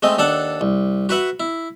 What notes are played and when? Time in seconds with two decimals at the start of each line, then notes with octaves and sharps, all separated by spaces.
0.03 G#3 A3 C4 D#5
0.18 D#2 D4 A4 F#5 A5
0.61 C2
1.09 F#4 B4 E5 F#5
1.40 E4